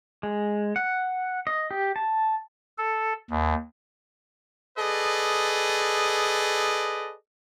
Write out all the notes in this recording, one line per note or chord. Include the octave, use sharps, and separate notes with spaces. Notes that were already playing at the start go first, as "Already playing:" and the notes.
G#3
F#5
D#5
G4
A5
A4
D#2
G#4 A4 B4 D5 D#5